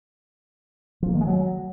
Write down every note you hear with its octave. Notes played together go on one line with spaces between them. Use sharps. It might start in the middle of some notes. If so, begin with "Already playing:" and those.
F3
A#3
D#3
G#3
F#3